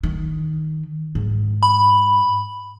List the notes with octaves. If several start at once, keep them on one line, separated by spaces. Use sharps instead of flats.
D#3
G#2
B5